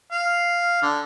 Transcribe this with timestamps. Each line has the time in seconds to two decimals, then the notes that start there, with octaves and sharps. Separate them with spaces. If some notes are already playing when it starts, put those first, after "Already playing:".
0.12 F5
0.82 D3